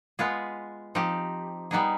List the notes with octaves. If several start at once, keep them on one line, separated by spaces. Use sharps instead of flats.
G#3 B3 F4 G#4
F3 C4 D#4 G4
G3 B3 D#4 G#4